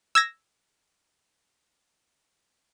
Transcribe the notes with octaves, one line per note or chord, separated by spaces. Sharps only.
E6 G#6 A#6